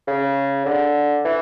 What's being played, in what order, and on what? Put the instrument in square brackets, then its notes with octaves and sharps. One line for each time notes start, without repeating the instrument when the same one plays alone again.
[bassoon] C#3
D3
E3